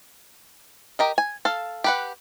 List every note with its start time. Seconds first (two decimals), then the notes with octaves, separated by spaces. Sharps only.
0.99 G4 A#4 D#5
1.18 G#5
1.45 A4 F5
1.84 G4 B4 F#5